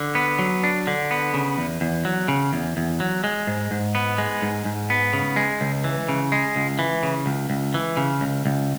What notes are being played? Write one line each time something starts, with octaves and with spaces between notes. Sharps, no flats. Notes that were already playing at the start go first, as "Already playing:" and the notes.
Already playing: D3
B3
F#3
D4
D3
B3
C#3
E2
E2
F#3
C#3
E2
E2
F#3
G#3
G#2
G#2
B3
G#3
G#2
G#2
B3
C#3
G#3
C#2
E3
C#3
G#3
C#2
E3
C#3
C#2
C#2
E3
C#3
C#2
C#2